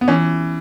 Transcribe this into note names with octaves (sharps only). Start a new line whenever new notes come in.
B3
E3 C#4